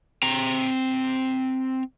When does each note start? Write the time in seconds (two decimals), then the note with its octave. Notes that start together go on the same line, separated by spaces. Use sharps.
0.23 C4 A#5